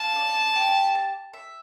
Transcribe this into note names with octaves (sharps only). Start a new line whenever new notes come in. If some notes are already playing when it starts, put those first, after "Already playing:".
Already playing: F5 A5
D5
G4
A5
E5